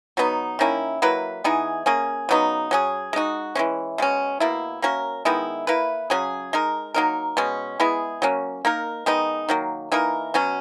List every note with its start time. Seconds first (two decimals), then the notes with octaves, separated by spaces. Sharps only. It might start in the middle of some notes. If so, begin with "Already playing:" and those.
0.17 B2 F#3 B3 D#4
0.59 D#3 A#3 C#4 E4
1.02 F#3 A#3 E4 B4
1.44 E3 B3 D#4 G#4
1.86 A#3 C#4 G#4
2.29 C#3 F#3 B3 D#4
2.71 F#3 C#4 G#4
3.13 G#3 D#4 F#4
3.55 E3 G#3 C#4
3.98 B2 G#3 C#4
4.40 B2 A#3 E4
4.82 A#3 C#4 F#4 A#4
5.25 D#3 G#3 B3 E4
5.67 A#3 E4 B4
6.10 C#3 F#3 C#4 G#4
6.53 G#3 D#4 A#4
6.94 F#3 A#3 D#4 A#4
7.37 B2 G#3 C#4
7.80 G#3 B3 E4 G#4
8.22 F#3 A#3 C#4
8.65 A#3 D#4 A#4
9.06 D#3 G#3 B3 D#4
9.49 D#3 F#3 A#3
9.92 E3 A#3 D#4 A#4
10.34 B2 F#3 C#4